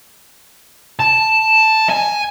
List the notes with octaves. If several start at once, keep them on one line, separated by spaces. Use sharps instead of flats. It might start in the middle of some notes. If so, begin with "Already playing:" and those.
A5
G#5